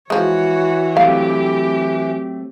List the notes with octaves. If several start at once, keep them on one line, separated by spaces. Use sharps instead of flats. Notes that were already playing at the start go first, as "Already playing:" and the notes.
E3 F3 G#3 F#4 C#5
F#3 A3 C4 G4 F5